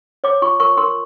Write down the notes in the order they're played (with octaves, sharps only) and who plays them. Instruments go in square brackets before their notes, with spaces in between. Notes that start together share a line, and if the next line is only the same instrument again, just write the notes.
[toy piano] C#5 D6
F4 C#6
A#4 C#6
A#4 C6